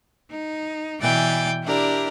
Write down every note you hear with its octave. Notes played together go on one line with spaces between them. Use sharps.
D#4
B2 E3 D5 G5 G#5 A6
D4 E4 G4 A#4 D5